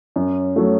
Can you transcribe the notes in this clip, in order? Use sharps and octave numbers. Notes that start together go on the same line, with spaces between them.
F#2
F#3 A3